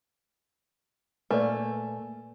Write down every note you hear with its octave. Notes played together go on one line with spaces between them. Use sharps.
A#2 A3 A#3 B4 D5 G#5